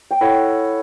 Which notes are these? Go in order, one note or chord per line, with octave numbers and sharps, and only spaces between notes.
G5
E4 A4 C#5 F#5